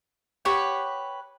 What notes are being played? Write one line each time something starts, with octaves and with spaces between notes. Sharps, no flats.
G4 B4 C#5 F#5